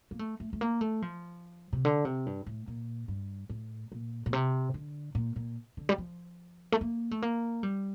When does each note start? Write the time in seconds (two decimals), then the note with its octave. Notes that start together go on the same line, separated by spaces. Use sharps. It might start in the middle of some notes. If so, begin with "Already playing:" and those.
0.11 A#3
0.19 A3
0.40 A3
0.53 A3
0.61 A#3
0.81 A3
1.02 F3
1.73 C3
1.85 D3
2.05 C3
2.26 G2
2.46 A2
2.67 A#2
3.08 G2
3.49 A2
3.92 A#2
4.26 A#2
4.33 C3
4.74 D3
5.15 A#2
5.36 A#2
5.77 D3
5.89 G3
5.98 F3
6.72 A3
6.81 A#3
7.11 A3
7.22 A#3
7.63 G3